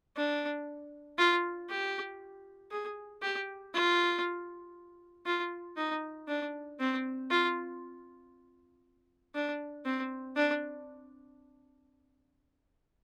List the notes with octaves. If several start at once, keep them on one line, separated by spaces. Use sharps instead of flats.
D4
F4
G4
G#4
G4
F4
F4
D#4
D4
C4
F4
D4
C4
D4